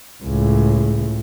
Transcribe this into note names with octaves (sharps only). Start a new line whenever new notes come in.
C#2 A2